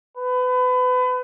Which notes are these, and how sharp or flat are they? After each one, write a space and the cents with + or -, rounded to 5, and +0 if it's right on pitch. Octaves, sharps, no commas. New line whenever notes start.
B4 +30